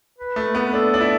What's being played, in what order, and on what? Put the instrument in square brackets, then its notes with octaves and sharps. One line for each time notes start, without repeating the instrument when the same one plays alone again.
[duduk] B4
[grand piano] A3
B3
[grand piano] D4 [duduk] A4
[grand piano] D4
E4